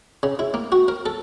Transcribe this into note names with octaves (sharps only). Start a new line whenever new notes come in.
C#3
E4
A#3
F#4
A#4
A4